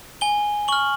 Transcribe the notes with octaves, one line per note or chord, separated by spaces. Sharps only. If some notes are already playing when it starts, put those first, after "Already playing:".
G#5 G7
C#6 F6 F#7